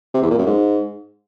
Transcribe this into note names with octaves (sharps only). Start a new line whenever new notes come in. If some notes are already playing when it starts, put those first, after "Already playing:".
C3
E2
A#2
F#2
G#2